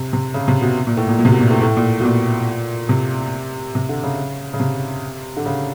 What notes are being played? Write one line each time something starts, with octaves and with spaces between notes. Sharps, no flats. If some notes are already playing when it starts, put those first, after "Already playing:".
Already playing: C3
C3
C#3
C3
B2
A#2
A2
A#2
A#2
C3
B2
A#2
A2
A2
A#2
B2
A#2
C3
C3
D3
C#3
C#3
C3
D3
C#3